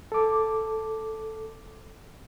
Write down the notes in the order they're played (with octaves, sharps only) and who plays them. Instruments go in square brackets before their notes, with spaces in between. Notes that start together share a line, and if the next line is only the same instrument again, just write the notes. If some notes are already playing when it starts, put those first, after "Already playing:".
[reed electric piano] A4 D6